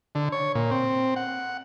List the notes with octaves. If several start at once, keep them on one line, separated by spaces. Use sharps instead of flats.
D3
C#5
A#2
C4
F#5